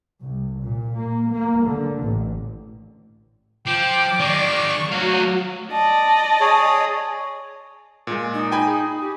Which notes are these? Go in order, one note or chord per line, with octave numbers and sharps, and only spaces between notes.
C2
A#2
A#3
A#3
D3
A1
F3 G5 D6
D#3 G#3 D5 C#6
F#3 A3 F#4 F5
D5 D#5 A5
G#4 C#5
A#2 G#3
D#4
G5 G#5 B5
G#4
G4